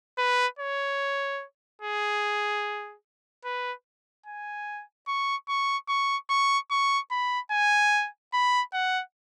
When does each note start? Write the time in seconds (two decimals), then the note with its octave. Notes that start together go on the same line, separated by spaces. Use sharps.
0.18 B4
0.59 C#5
1.82 G#4
3.45 B4
4.26 G#5
5.07 C#6
5.48 C#6
5.88 C#6
6.30 C#6
6.71 C#6
7.11 B5
7.51 G#5
8.34 B5
8.74 F#5